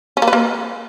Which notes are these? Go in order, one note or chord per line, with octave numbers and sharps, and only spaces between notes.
C#4
A#3
B4
A#3